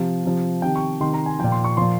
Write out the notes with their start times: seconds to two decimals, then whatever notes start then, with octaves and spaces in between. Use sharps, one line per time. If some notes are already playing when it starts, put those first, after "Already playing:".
Already playing: C3 F3
0.24 C3 F3
0.62 C3 D#3 G5
0.76 C#6
1.01 C3 D#3 C6
1.13 A#5
1.26 G#5
1.39 A#2 F3 G5
1.52 C6
1.64 C#6
1.77 A#2 F3 C6